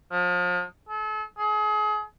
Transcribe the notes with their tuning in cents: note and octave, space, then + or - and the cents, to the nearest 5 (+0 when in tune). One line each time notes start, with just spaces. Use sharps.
F3 +35
A4 -40
G#4 +35